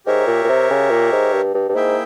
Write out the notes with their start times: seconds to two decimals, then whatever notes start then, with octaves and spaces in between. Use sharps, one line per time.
0.06 G#2 G4 A#4 C#5 E5
0.27 A#2
0.44 A#2
0.49 C3
0.70 C#3
0.90 A#2
1.12 G#2
1.33 G2
1.54 G2
1.69 G2
1.75 G#2 A#3 E4 G#4 E5 G5